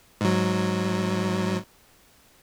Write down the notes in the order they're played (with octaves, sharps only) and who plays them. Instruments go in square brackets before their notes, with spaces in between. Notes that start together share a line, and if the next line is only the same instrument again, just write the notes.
[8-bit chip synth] G#2 F#3